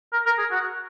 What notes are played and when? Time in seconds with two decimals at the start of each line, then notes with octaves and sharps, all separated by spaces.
0.13 A#4
0.26 A#4
0.39 G#4
0.51 F#4